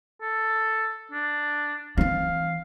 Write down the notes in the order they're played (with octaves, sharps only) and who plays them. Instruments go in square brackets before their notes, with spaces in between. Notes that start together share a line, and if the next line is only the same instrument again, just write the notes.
[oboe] A4
D4
[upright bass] E3 C4 [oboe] F5